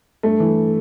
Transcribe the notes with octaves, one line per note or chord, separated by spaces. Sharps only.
G2 A3
E3